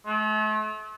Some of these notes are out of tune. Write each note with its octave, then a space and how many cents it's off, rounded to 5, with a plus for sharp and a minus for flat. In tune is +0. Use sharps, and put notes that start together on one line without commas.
A3 -40